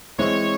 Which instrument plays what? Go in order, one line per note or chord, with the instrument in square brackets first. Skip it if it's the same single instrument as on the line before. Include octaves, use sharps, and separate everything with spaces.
[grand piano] E3 G#3 C4 E4 [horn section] C#5